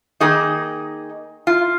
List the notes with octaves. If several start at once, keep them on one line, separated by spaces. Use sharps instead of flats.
D#3 A#3 D#4 G#4
F4